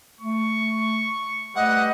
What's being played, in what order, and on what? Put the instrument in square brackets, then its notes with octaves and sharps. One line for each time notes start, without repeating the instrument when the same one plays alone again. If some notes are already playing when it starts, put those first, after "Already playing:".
[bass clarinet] A3 [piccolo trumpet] C#6
[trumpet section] G3 B4 D#5 [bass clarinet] A3 [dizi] F#5